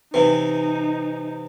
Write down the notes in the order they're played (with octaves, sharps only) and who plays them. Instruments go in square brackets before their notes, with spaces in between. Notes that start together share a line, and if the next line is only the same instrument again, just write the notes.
[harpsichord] C3 E3 [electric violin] D#4 [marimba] B4